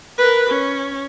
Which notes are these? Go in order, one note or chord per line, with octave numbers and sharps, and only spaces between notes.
A#4 B4
C#4